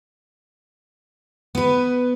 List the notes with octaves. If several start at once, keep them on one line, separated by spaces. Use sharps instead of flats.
B3 B4